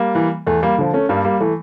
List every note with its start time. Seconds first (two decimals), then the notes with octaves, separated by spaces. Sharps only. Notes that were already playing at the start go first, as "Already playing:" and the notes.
Already playing: G3 A#3
0.15 E3
0.47 E2 A3
0.62 G3 A#3
0.78 D3 F3
0.94 A3 C#4
1.09 G2 G3 A#3
1.24 G3 A#3
1.40 E3 A3